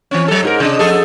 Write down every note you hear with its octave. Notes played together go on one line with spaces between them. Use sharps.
E3 C4 C#4
F#3 A4
G#2 G4 A#4
C3 D4 D#5
F2 G#4 A4